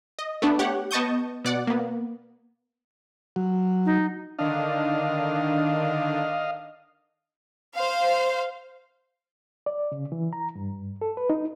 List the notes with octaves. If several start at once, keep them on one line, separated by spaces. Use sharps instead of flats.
D#5
A3 B3 D4
G4 C#5 F#5
B3 D#5 A5 C#6 D#6 G6
B2 D5 F#5
A#3 B3
F#3
D#4
D3 D#3 D4 D#5 F5
C5 F5
D5
C#3
E3
A#5
G2
A4
B4
D#4